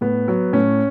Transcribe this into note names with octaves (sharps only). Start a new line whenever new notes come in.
A2 B3
F#3
A2 C#4